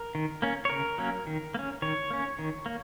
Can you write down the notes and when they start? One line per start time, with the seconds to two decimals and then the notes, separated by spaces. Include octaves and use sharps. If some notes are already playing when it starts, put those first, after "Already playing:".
Already playing: A#4
0.15 D#3
0.42 A#3 C#4
0.65 C#5
0.70 C#3 A#4
0.98 F#3 A#3 C#4
1.27 D#3
1.54 A#3
1.59 C#4
1.82 D#3 C#5
2.11 A#3 C#4
2.39 D#3
2.66 A#3